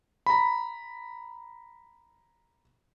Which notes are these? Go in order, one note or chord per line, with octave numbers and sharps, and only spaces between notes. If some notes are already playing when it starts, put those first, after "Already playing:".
A#5 B5